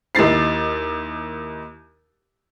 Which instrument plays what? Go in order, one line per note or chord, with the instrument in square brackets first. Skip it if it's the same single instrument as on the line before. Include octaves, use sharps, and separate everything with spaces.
[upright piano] D#2 E4 A6 C7